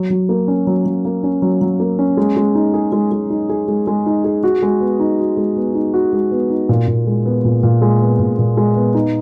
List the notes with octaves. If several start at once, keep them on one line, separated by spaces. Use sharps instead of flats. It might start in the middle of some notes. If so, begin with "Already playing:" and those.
Already playing: F#3
F#3
A#3
C#4
F#3
F#3
A#3
C#4
F#3
F#3
A#3
C#4
G#3
G#3
D#4
G#4
G#3
G#3
D#4
G#4
G#3
G#3
D#4
G#4
F#4
G#3
B3
D#4
F#4
G#3
B3
D#4
F#4
G#3
B3
D#4
A#2
A#2
G#3
B3
A#2
A#2
G#3
B3
A#2
A#2
G#3
B3
D#4